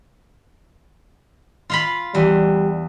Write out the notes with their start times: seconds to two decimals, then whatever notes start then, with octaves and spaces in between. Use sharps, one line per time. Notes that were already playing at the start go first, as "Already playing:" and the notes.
1.70 F4 F5 B5
2.15 E2 G3